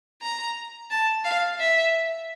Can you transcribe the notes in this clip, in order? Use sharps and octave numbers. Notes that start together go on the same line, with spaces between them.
A#5
A5
F5
E5